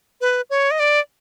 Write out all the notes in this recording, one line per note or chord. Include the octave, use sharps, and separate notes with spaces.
B4
C#5
D#5
D5